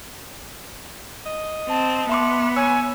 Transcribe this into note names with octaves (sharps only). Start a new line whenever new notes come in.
D#5
C4 A5
B3 E5 C6 D6
C#5 G#5 E6